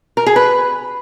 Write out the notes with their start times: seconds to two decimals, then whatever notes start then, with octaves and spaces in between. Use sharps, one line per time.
0.17 A#4
0.26 G#4
0.36 B4